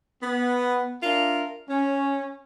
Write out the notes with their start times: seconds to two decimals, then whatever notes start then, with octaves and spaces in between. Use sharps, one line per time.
0.23 B3
1.03 D4 F4 A#4 E5
1.70 C#4